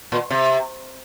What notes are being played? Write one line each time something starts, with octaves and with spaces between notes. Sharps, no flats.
A#2
C3